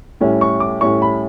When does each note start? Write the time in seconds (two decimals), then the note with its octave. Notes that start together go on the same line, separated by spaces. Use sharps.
0.21 A2 G3 C#4 E4
0.41 C#6
0.60 D6
0.81 A2 G3 C#4 E4 C#6
1.02 B5